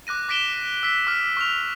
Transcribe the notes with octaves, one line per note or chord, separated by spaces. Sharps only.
D6 F#6 A#6 D#7
D6 A#6 B6 D7 E7 G7
E6 B6
D6 F6 B6
C#6 F6 F7